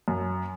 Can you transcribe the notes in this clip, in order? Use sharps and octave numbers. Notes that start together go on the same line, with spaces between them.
F#2